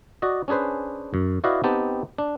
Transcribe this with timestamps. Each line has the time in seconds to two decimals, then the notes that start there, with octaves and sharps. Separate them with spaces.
0.22 F#4 D5 D#5
0.48 C#4 D4 G#4 B4 C5
1.14 F#2
1.44 E4 F#4 B4 D5 D#5 F5
1.64 B3 C4 D#4 G4 A5
2.18 D4